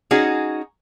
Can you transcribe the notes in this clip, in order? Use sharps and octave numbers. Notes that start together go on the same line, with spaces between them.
C#4 D#4 F#4 G#4